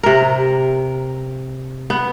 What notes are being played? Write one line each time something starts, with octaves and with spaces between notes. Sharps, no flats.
C3 A#4
B3